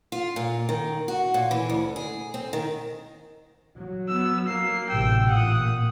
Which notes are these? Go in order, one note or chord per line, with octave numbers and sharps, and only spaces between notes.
F4
A#2
D#3
F#4
A#2
E3
D2
G#4
C4
D#3
F#3
B3 E6
A#3 C7
A1 C3 G5 E6
A#2 F#5 D#6